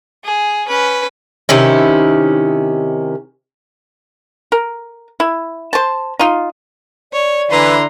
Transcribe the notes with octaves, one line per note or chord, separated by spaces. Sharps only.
G#4
C#4 B4
C3 D#3 C#4 E4
A#4
E4
C5 A5
D#4 F4
C#5 D5
D3 E3 E4 B4 A#5 C6